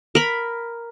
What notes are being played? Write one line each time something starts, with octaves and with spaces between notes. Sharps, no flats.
A#4 B5